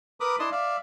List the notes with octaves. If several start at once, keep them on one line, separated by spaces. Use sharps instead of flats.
A#4 B4 B5 D6 D#6
D4 E4 D#5 A5 C6 D#6
D5 E5 F5